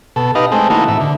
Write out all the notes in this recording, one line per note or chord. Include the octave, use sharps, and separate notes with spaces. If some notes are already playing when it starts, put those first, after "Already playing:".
B2 A4
D#4 G4 B4 D#5 F5
G#3 A3 C4
E3 A3 A#3 D#4 F#4
A2 E5
D3